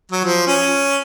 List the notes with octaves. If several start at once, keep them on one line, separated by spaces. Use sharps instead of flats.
F#3
F3
C#4